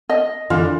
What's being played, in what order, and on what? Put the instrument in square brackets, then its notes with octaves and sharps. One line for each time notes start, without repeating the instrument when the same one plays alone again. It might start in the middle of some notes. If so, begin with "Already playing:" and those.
[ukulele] D#5
[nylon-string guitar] D3 E3 [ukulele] F4